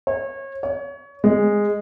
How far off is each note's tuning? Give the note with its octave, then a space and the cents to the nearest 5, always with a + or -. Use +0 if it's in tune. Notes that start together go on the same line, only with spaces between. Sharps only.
C#5 -30
C#5 +25
G#3 -10